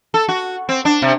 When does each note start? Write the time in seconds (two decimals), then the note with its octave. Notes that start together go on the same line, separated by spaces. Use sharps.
0.14 A4
0.28 F#4
0.69 C4
0.85 D4
1.02 C3